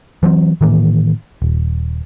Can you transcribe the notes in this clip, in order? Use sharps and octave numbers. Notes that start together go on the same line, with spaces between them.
E3 F#3 G#3 C4
A2 D#3 E3 A#3
D#1